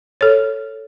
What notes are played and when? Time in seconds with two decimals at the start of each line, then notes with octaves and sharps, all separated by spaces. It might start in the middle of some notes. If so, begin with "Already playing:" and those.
0.21 A4 C#5